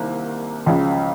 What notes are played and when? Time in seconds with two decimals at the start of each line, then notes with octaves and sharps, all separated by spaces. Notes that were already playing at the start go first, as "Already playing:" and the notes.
Already playing: C2 C3 D#3 A#3
0.66 C#2 C#3 F3